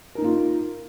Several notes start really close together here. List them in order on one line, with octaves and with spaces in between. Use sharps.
A#4 D#4 A#3 F4